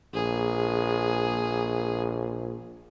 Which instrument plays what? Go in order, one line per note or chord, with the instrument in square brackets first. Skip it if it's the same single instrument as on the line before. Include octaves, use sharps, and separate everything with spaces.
[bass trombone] A#1 [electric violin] G#4